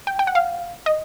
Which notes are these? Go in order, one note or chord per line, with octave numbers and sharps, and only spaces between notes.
G5
G5
F#5
F5
D#5